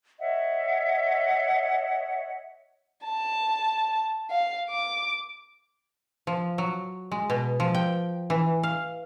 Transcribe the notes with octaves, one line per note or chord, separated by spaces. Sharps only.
C#5 D#5 E5 F#5
A5
F5
D6
F3
F#3
G#3
B2
F3
G5
E3
F5